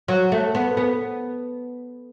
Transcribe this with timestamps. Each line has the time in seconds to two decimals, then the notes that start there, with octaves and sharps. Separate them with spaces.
0.08 F#3
0.32 A3
0.55 B3
0.77 B3